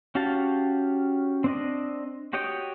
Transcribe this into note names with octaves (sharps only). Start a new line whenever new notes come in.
C#4 F#4 G4 F5 A5
C4 D4 D#5
F#4 G4 C#5 D#5 G5